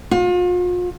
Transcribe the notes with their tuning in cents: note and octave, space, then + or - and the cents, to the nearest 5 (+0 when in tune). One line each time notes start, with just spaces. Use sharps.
F4 +40